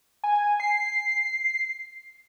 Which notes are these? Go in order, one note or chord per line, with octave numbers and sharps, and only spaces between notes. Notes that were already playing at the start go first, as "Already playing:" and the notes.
G#5
C7